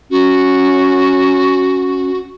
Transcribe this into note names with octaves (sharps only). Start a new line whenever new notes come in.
C#4 F#4